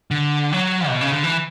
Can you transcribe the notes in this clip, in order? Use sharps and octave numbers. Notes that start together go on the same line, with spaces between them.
D3
F#3
B2
C#3
D3
E3